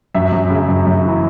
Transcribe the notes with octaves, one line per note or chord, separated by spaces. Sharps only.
F#2 E5
F#2
C#3
F#2
F#2
E3